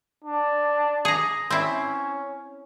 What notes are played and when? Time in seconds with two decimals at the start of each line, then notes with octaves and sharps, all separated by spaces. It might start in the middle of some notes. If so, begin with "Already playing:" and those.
0.24 D4
1.05 G#4 A#5
1.50 C4 C#4 E4